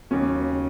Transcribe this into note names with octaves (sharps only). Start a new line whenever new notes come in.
D#2 C#3 F#3 C#4